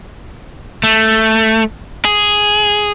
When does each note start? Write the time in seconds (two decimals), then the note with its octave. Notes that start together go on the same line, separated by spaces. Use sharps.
0.83 A3
2.05 G#4